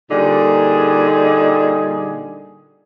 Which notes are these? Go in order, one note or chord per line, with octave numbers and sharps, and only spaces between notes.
A#2 D3 G3 D#4 G#4